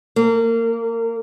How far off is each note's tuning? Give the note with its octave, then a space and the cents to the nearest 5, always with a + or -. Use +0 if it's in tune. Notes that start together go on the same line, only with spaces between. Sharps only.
A#3 -25